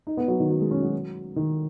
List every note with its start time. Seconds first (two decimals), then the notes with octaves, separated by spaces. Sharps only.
0.07 D#4
0.17 B3
0.28 F#3
0.40 D#3
0.50 F#3
0.61 G#3
0.71 C#4
0.82 F#3
1.36 D#3